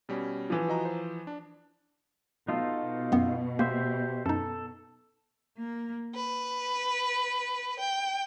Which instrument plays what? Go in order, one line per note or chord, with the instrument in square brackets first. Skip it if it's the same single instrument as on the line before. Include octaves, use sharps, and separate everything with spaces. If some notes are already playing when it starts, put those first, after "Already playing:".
[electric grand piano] B2 G3 C#4
[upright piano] E3 F3
[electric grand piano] F#4 D#5 A#5
C5
D4
[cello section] B2 [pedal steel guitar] D#4 F4 A4
[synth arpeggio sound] F#2 B3
[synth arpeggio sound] A#3 [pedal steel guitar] G4 C5 E5
[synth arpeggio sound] F#2 D#4 [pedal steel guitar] A4
[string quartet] A#3
B4
G5